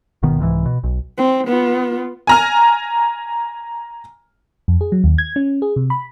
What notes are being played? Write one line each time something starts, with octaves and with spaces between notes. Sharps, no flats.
G1 B2 D#3 B3
C2 G#2 D3 E3
B2
B1
C4
B3 F4
G#5 A#5 F6
F2
G#4
F#3
D#2
G#6
C#4
G#4
C3
B5